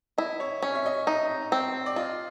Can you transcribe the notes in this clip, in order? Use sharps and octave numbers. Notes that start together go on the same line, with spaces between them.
E4 D#5
C#5
C#4 C#5
E5
D#5
D#4 E5
C4
D5
F4 D#5